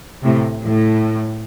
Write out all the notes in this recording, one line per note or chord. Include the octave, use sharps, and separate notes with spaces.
A2 C3
A2